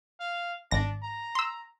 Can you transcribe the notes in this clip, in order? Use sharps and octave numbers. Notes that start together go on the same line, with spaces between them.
F5
G#1 D4 A#6
A#5
C6 E6